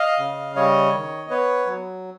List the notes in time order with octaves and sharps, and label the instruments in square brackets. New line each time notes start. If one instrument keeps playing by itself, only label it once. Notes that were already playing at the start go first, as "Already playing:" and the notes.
Already playing: [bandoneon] D#5 F5
C#3
G3 C#5 D#5
D#3
B3 B4 C#5
F#3